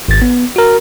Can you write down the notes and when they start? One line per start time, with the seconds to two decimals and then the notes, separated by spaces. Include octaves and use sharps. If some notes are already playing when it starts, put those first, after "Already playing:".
0.08 G#1 A6
0.22 B3
0.56 F#4 A#4